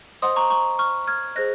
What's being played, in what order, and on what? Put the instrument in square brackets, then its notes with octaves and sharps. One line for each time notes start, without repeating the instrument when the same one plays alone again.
[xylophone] C5 D#5 F#5 C6 D#6
A#5 C#6
A#5 C#6
C#6 F6
F6 G#6
G#4 C5 D#5 F#6 A#6